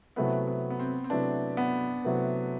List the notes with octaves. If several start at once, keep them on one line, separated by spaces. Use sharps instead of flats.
C3 F#3 A3 B3 E4 B4
B3
B3
C4
C4
C3 F#3 A3 D4 E4 B4
B3
C3 F#3 A3 E4 B4